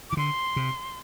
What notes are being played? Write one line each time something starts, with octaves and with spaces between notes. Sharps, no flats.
E3 D6
D3 C6
C3